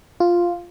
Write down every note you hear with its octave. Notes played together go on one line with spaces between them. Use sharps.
F4